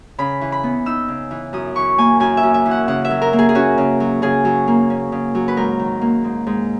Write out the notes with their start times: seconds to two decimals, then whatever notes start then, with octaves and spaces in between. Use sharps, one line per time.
0.18 C#3 B5
0.41 E3
0.52 B5
0.64 B3
0.86 D#4 E6
1.08 C#3
1.31 E3
1.53 F#2 D#6
1.75 E3 C#6
1.98 A#3 G#5
2.20 F#2 G#5
2.37 E5
2.43 F#2
2.54 E5
2.65 E3
2.71 F#5
2.88 C#3 F#5
3.05 E5
3.10 F#3
3.22 A#4
3.33 A#3
3.39 G#4
3.49 G#4
3.55 C#4 F#4
3.78 C#3
4.00 F#3
4.22 C#3 G#4
4.45 F#3
4.67 A#3
4.90 C#4
5.12 C#3
5.35 F#3
5.48 B4
5.57 G#2 A#4
5.79 D#3
6.01 A#3
6.24 G#2
6.47 G#2